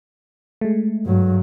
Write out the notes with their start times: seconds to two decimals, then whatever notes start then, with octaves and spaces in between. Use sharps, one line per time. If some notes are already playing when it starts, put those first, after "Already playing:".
0.61 G#3 A3
1.06 G2 F#3